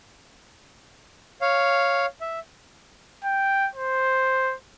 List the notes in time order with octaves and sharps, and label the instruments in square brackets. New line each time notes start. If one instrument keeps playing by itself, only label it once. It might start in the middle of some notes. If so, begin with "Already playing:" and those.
[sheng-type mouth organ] C#5 F5
E5
[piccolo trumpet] G5
C5